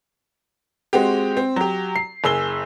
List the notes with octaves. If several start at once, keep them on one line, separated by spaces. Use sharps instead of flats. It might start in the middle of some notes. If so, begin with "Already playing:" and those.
G#3 C4 F#4 G4
C4
F#3 G4
C7
F#1 G#4 E6 G7